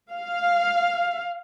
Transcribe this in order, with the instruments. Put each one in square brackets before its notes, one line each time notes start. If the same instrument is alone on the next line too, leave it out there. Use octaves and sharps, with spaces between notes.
[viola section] F5